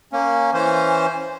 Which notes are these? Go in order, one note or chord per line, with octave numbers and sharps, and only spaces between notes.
A#3 C#4
E3 C#4 C5